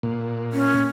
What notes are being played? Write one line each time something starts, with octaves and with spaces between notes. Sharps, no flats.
A#2
C#4